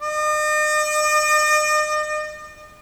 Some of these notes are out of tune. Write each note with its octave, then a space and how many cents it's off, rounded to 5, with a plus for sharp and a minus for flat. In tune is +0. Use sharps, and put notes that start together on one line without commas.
D#5 -40